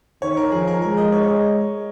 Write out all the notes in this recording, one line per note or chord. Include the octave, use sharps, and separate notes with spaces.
D#3 C#5
A#4
F3 G#4
A#4
G#3 A#4
D#5
C#5